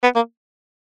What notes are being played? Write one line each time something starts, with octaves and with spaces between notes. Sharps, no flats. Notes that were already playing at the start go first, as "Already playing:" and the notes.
B3
A#3